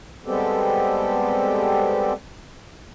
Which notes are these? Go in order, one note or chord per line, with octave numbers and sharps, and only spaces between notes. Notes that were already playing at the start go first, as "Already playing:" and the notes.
G3 G#3 B3 C4 G4 A4